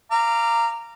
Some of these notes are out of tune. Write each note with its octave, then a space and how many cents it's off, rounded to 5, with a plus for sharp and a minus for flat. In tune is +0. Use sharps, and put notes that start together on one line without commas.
F5 -25 A#5 -10 D6 +0